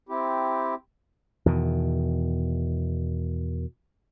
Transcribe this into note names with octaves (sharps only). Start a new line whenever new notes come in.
C4 E4 G4
E2 B2 D#3